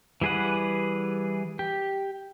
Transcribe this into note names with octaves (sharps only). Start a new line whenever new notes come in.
E3 G3 G#4 B4 F#5
G4